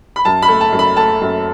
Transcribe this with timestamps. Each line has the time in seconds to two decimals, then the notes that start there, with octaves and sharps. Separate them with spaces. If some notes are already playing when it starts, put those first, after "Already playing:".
0.16 B5
0.25 F#2 A5
0.42 B5
0.48 A3
0.61 A5
0.72 F#2
0.79 B5
0.97 A3 A5
1.21 F#2